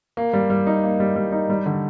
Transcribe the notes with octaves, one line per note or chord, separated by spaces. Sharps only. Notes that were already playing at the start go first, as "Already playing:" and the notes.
A#3
G3
G3
D#4
A#3
G3
G3
D#4
G3
D3